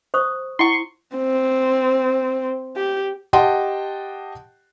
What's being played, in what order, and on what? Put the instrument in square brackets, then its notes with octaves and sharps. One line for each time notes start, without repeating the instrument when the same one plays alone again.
[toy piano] C5 C#6 D#6
[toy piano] E4 F#5 [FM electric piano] C6 C#6
[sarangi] C4
G4
[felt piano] G4 D#5 F#5 G5 A5 C6